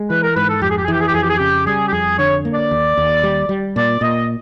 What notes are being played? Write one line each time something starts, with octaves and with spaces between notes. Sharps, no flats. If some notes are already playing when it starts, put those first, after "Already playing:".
Already playing: G#3
E3 B4
A#4
G#2 B4
A4
F2 G4
G#4
G4
G#4
E3 G4
G#4
G4
F2 G#4
G4
G#4
C#3 G4
G3 G#4
G4
F2 G#4
D3 C#5
A#3
D5
D#2
D#2
G3
G3
A#2 D5
A#2 D#5